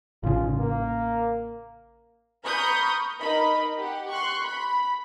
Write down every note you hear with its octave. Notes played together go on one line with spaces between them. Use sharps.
A1 C#3 F4
A#3
A#5 B5 C#6 D#6 F6 G6
D#4 A#4 D#5 B5
G4 F#5
C6 C#6 F#6
B5